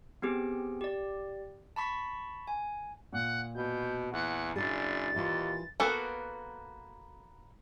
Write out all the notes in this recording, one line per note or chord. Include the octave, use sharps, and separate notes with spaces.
B3 C4 G4 G#4
G4 D5
A5 B5 C#6 B6
G#5
A#2 F#5
B2 G6
E2 F#5
F#1 D4 G#4 A6
D#2 E3 F4
A#3 B3 F#4 A4